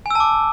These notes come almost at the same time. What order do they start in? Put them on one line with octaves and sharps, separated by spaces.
G#5 E6 A5 D6